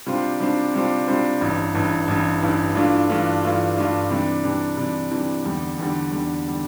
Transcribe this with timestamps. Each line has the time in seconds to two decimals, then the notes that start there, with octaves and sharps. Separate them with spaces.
0.06 C3 G3 D4 F4 C5
0.40 C3 G3 D4 F4 C5
0.74 C3 G3 D4 F4 C5
1.08 C3 G3 D4 F4 C5
1.41 A1 G2 E3
1.74 A1 G2 E3
2.08 A1 G2 E3
2.42 A1 G2 E3
2.75 G2 E3 A3 D4 F4
3.09 G2 E3 A3 D4 F4
3.43 G2 E3 A3 D4 F4
3.77 G2 E3 A3 D4 F4
4.10 C3 E3 G3 D4
4.44 C3 E3 G3 D4
4.77 C3 E3 G3 D4
5.11 C3 E3 G3 D4
5.45 E2 D3 G3
5.78 E2 D3 G3
6.12 E2 D3 G3
6.47 D3 G3